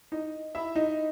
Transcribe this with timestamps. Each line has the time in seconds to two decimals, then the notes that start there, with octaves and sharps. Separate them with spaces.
0.12 D#4 D#5
0.55 E4 E5
0.76 D#4 D#5